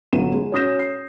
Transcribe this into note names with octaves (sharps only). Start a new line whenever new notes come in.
G1 F#3 D#7 E7
G#3
C#4 F#4 D#6 G6 A#6 E7
C7